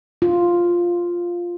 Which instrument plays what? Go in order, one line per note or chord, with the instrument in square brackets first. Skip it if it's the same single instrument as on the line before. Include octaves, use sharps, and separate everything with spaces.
[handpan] F4